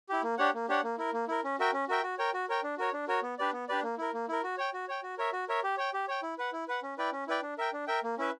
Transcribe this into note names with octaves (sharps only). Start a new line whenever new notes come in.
E4 G4
A#3
D4 G4 C#5 F#5
A#3
D4 G4 C#5 F#5
A#3
E4 A#4
A#3
E4 A#4
C#4
F#4 A#4 E5 G5
C#4
F#4 A#4 E5 G5
F#4
A#4 C#5 G5
F#4
A#4 C#5 G5
D4
F#4 A#4 C#5
D4
F#4 A#4 C#5
B3
D4 G4 B4 D5
B3
D4 G4 B4 D5
A#3
E4 A#4
A#3
E4 A#4
F#4
C#5 G5
F#4
C#5 G5
F#4
A#4 C#5 E5
F#4
A#4 C#5 E5
G4
C#5 G5
G4
C#5 G5
E4
B4 F#5
E4
B4 F#5
C#4
E4 B4 D5 G5
C#4
E4 B4 D5 G5
D4
A#4 E5 G5
D4
A#4 E5 G5
A#3
C#4 E4 B4 E5